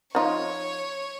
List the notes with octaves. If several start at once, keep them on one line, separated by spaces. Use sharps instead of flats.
F3 D#4 F4 C#5